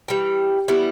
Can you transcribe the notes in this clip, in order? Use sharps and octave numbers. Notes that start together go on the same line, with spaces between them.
E3 G3 G5
E3 G3 B3 E4